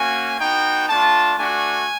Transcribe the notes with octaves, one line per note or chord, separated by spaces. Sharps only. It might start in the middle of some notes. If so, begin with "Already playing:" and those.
Already playing: A#3 C#4 F#4 G#5
B3 D#4 F#4 G5
A3 D4 F4 A5
A3 D4 F#4 G#5